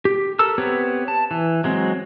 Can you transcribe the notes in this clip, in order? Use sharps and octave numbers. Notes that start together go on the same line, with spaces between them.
G4
A4 A#4 E6
B3 C4 G4 B4 C#5
A5
E3
F#3 G#3 C4